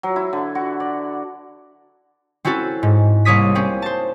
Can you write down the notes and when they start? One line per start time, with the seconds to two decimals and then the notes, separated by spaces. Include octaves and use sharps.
0.03 F#3
0.16 E4
0.33 D3
0.55 F#4
0.80 D5
2.45 C4 C#4 E4 F#4 A4
2.83 G#2
3.25 C2 A#3 C#5 D#6 B6
3.55 C4 C#4
3.82 C5 A5